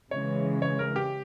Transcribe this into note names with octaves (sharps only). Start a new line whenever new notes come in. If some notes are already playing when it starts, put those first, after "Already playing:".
C#3 E3 G#3 C#5
C#5
A#4
G4